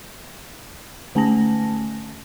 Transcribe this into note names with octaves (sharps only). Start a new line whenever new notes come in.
D3 A3 C#4 G#5 A5 A#6